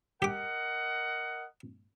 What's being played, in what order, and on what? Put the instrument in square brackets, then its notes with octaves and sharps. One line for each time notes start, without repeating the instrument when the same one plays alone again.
[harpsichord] G4 D6 [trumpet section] A#4 D#5 F#5